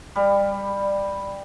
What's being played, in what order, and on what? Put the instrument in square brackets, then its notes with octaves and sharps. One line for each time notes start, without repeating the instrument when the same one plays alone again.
[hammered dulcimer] G3